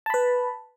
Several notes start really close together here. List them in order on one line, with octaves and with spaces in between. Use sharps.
A5 B5 B4